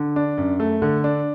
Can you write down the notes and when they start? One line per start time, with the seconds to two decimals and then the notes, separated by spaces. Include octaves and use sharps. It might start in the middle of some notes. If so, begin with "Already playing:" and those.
Already playing: D3
0.16 D4
0.38 F#2
0.60 A3
0.82 D3
1.04 D4